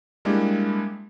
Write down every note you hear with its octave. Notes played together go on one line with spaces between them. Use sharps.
G3 G#3 A#3 D4 E4 G4